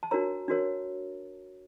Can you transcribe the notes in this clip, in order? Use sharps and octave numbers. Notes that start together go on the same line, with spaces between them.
A5
D4 F#4 A#4 C#5 A#5
D4 F#4 A#4 C#5